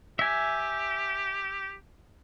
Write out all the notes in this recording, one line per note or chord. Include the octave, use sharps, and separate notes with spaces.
G4 E5 G#5